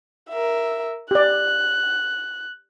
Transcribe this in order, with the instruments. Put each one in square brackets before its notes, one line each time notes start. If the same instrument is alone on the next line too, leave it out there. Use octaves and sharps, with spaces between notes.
[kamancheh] A#4 E5
[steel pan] G4 D5 [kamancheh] F#6